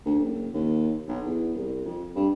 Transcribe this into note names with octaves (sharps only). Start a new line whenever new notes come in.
D2
F#1
D#2
B1
E2
C2
F2
G2